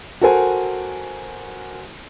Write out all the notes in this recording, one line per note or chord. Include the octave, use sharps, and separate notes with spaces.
F#4 A4 A#4 C5 G#5